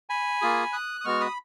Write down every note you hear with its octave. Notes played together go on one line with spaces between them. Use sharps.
G#5 B5
A#3 F4 G#4
D#6 F#6
D#6
G#3 B3 F#4 C#6 F6
B5 D#6